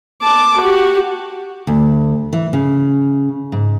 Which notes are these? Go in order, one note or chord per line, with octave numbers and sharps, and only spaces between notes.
A5 D6
F#4 G4
D2
E3
C#3
G#2